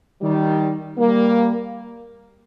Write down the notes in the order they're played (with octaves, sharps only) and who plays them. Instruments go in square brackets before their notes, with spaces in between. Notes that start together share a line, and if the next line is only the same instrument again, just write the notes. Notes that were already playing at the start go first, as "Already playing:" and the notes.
[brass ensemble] D#3 G3
G3 A#3